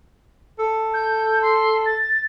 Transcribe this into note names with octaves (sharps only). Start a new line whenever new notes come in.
A4
G6
C6
A6